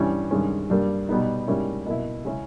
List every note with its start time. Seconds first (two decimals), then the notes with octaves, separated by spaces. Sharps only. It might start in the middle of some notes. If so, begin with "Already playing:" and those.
Already playing: G2 E3 G3 C#4 E4
0.31 G2 D#3 G#3 C#4
0.70 G2 G3 A#3
1.09 B2 G3 B3 D#4
1.47 G#2 G3 A#3 C#4 E4
1.86 B2 A#3 E4
2.25 C#3 G#3 C#4 E4